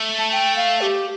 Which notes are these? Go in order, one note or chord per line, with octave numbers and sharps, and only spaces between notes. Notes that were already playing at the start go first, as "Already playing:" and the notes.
Already playing: A3
A5
G5
F5
G4